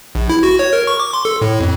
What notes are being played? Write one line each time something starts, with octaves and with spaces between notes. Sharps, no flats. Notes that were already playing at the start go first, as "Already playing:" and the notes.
A#1
E4
F#4
C#5
A#4
C#6
D6
C6
A4
A2
F2